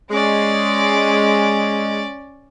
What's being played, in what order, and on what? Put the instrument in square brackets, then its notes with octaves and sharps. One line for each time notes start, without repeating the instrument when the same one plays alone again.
[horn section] G#3 [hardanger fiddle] C#4 D5